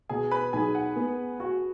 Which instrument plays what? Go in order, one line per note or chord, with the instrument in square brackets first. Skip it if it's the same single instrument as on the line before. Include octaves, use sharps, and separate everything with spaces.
[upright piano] B2 [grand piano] G#4 G#5
[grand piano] B4 B5
[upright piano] B1 [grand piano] G#4 G#5
[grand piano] F#5
[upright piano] B3
F#4